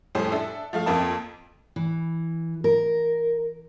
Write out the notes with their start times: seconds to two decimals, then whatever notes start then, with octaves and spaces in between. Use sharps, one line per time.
0.15 F2 A2 G3 C5 G#5
0.32 D4 A4 E5
0.73 F3 A3 F5
0.86 F2 A#3 C4 A5
1.76 E3
2.64 A#4